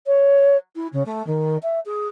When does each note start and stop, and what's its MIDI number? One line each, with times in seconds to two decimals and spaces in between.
0.07 0.57 73
0.76 0.87 64
0.93 1.03 49
1.06 1.25 57
1.27 1.57 51
1.63 1.80 76
1.86 2.08 68